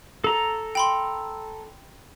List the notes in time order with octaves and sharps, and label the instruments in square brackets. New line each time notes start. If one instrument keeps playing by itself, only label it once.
[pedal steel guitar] A4 A#5
[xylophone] G5 B5 C6